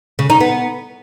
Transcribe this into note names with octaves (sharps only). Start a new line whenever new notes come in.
C#3
D#4
B3